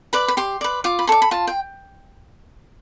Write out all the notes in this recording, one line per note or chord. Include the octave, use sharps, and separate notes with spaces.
B4 D5 B5
B5
G4 C6
B4 D5
F4 D6
B5
A4 D5 C6
B5
F4 A5
G5